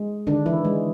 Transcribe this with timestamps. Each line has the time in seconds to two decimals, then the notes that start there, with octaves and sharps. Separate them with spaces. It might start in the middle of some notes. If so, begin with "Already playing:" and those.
Already playing: G#3
0.27 D3 D#3 D4
0.46 E3 E4
0.65 G#3